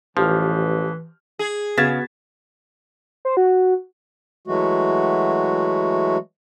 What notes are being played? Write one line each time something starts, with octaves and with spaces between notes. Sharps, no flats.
A1 E3 F3 G4 F6
G#4
C#3 B3 F#4 G#6 A6 B6 E7
C5
F#4
E3 F#3 G#3 A3 F#4